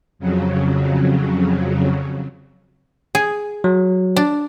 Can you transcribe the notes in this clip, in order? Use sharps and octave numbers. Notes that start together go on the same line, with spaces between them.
F2 C#3 F#3
G#4
F#3
D4